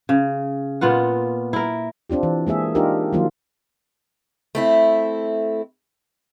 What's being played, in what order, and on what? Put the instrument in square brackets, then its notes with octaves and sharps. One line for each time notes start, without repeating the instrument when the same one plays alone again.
[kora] C#3
A#2 B3 F4 F#5
E4 A#4
[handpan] C4 D4 F4 G4
E3
G#3 A#3 G#4 E5
D4 D#4 F4 G4 A#4
D#3 F3 F#3 A#3 F4
[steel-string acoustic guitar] A3 C4 E4